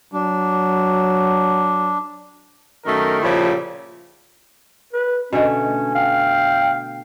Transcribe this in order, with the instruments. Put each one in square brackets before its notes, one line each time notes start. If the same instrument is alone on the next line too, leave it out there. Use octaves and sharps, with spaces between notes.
[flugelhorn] F#3 [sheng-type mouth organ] D4
[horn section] F#2 D#3 A3 A#4
A#2 C#3 F3 G3 E4
[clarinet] B4
[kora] B2 D3 A3 [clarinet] C#4
[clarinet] F5 [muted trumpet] G5